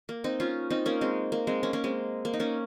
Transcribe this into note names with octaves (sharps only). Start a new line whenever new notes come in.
A#3
C4 D#4
C#4 F4
C4 D#4
A#3 C#4
G#3 C4
A#3
G#3 C4
A#3 C#4
A#3 C#4
G#3 C4
A#3
D#4
A#3 C#4